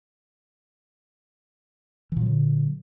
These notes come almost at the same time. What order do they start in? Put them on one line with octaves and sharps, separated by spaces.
E3 A#2 F#3 D3